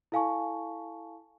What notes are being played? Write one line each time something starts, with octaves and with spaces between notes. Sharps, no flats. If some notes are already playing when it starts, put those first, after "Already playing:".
E4 A4 F5 G#5 A5 C#6